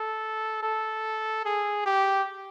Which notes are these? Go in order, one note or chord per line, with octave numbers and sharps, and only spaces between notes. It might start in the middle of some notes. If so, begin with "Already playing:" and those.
Already playing: A4
A4
G#4
G4